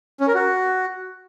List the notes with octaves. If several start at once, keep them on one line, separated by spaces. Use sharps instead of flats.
C#4
A#4
F#4